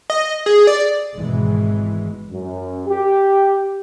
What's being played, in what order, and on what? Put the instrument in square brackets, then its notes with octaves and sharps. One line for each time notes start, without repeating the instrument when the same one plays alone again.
[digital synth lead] D#5
G#4
D5
[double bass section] G#1 B2 E3 G#3
[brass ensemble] F#2
G4